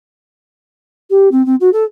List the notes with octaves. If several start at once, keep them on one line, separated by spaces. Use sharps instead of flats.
G4
C4
C4
F#4
A4